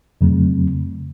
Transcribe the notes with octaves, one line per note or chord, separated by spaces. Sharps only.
F2 C#3 F#3 A3 C4